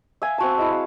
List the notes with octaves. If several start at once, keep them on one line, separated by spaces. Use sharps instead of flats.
E5 F5 G#5
C4 F#4 A5
G#3 E4
F5